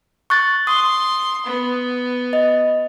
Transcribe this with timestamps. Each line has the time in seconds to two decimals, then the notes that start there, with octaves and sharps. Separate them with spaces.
0.30 C#6 F#6 A6
0.67 C6 D#6
1.46 B3
2.33 D#5